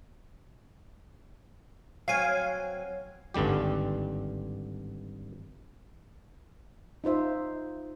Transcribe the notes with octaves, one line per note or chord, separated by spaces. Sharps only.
F#3 C4 F5 G#5
G#1 G2 D3 G3 G4
D#4 F4 C5 E5